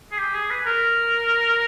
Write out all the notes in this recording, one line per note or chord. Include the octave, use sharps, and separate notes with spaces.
G#4
G4
G#4
B4
A#4